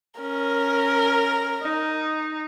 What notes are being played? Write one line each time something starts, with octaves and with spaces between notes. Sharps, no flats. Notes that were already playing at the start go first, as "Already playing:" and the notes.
C#4 A#4
D#4